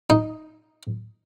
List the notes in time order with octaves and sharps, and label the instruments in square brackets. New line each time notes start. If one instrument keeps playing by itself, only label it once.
[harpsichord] D#4